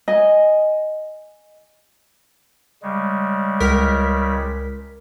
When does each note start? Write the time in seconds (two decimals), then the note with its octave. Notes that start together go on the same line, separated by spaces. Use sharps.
0.08 D#5 G#5
2.82 C#3 G3 G#3
3.60 C#2 A#4 B6